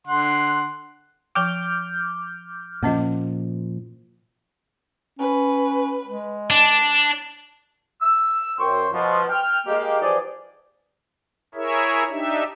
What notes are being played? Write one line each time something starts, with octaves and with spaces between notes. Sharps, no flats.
D3 F#5 C6
F3 G5 D6 F6 G6
A#2 F3 A#3 C#4 D#5
C#4 B4
G#3
D4 A5 D6
E6
F#2 C5 G5 C#6
B2 F3
G5 F6
G#3 A#3 G4
E3 F3 D#4 G4 G#4 D5
E4 G#4 A#4 C#5 E5
D4 D#4 G4 E5